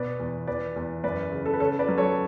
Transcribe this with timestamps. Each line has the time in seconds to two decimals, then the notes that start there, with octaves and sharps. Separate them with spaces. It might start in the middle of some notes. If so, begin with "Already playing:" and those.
Already playing: B2 B4 D5
0.20 E2
0.47 E2 B4 D5
0.76 E2
1.04 F#2 B4 D5
1.32 C#3
1.45 A4
1.54 B4
1.60 C#3 A4 C#5
1.79 B4 D5
1.89 F#3
1.97 A4 C#5